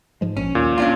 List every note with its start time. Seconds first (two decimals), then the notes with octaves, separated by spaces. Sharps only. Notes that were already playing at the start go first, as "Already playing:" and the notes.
0.21 G#2 F3 G#3
0.37 A#1 C#4
0.55 D#2 A#2
0.78 C#4 D4 F4